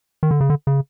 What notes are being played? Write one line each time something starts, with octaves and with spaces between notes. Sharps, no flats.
D#3
D3
C#3
D3
C#3